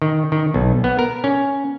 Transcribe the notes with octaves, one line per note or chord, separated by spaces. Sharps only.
D#3
D#3
B1
B3
A#4
C#4